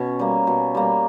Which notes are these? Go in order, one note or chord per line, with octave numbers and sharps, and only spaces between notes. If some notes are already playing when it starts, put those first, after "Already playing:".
Already playing: B2 C#4
G3 A#3
B2
G3 A#3